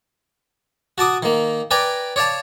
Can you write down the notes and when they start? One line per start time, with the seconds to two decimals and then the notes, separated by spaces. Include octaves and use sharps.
0.98 F#4 A5 D6 D#6
1.23 D#3 A#3
1.71 B4 D5 G5 G#5 A#5
2.16 C#5 D5 F5 A5